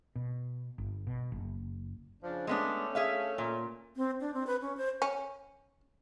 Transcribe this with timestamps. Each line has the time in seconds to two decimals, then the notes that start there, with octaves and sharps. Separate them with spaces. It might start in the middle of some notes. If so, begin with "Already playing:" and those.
0.15 B2
0.78 G1
1.07 B2
1.32 F#1
2.23 C#3 F3 D4
2.47 G#3 A3 B3 C#4 D4
2.95 G#4 E5 F5
3.38 A#2
3.96 C4
4.21 D4
4.34 C4
4.47 B4
4.62 C#4
4.77 C5
5.02 C#4